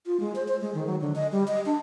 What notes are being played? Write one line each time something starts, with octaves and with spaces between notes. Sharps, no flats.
F4
G#3
C5
C5
G#3
D#3
F#3
D3
D#5
G3
D#5
D4